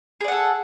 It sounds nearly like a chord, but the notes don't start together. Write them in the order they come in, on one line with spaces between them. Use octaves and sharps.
G#4 D5 F#5 A4